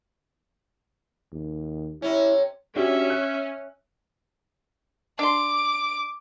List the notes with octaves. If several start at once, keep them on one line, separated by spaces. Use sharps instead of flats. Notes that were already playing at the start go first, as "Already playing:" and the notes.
D#2
C3 C#4 E4
C#4 D4 F#4 G4 E5
F#6
D4 C6 D6